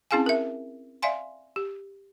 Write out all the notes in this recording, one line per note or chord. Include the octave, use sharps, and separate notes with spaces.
C4 C#4 E4 G#4 F5 G#5
A#4 E5
D5 E5 F5 G#5 C6
G4